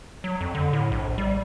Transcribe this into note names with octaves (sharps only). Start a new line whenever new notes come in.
F#3
F2
D3
A2
A#1
G3